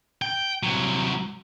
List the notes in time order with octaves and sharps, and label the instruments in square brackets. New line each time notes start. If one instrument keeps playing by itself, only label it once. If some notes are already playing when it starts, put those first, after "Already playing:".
[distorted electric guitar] G5
C2 F#3